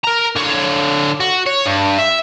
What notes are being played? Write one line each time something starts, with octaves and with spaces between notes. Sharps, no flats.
A#4 A#5
D3 C#5
F#4
C#5
G2
E5